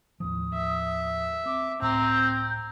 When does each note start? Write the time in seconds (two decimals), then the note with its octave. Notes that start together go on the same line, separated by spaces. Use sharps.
0.20 D#2 A2 F3 D#6
0.54 E5
1.46 C4 D6
1.82 C#2 A2 C4 A#5 G6